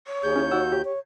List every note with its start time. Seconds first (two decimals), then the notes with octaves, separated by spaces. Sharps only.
0.06 C#5
0.23 D#2 G#4 G6
0.36 C#4 E4
0.51 D#4 F#4 F#5 E6
0.72 G4
0.85 C#5